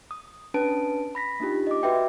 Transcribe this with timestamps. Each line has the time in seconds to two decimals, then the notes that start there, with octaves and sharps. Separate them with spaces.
0.11 D#6
0.54 C#4 D4 B4 A5 D7
1.15 B5 A#6 B6
1.40 A#3 D4 D#4 F4 G4
1.67 D#5 D6
1.83 F#4 B4 E5 G5